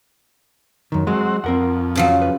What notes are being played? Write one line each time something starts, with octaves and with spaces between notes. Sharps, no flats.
F#2 D#3
F#3 G#3 C4 F#4
F2 C4 A#4 F#5
C#3 F3 F#3
B4